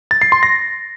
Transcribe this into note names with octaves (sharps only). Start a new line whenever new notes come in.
A6
C7
C6
A#6